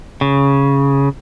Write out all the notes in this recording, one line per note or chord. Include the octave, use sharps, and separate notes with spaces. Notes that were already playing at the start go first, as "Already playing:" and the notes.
C#3